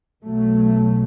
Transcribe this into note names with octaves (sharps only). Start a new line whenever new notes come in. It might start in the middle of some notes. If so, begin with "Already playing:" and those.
B1 B2 F#3 A3